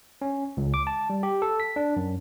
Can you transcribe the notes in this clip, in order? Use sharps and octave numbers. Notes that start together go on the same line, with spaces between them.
C#4
C#2
D6
A5
G3
G4
A4
B6
D4
F#2